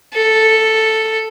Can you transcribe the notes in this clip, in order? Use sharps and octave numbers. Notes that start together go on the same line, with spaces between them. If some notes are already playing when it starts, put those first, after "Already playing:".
A4